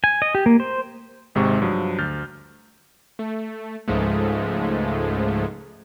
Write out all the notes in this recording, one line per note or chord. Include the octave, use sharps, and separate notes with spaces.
G#5
D#5
G4
A#3
C5
G#1 G#2 C3 G#3 C#6
G2 F3 F#3
D2 F6 G6 A6
A3
C#2 G#2 F3 G#3 A3